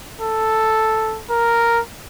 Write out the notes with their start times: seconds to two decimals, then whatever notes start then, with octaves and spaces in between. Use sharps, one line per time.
0.21 A4
1.30 A#4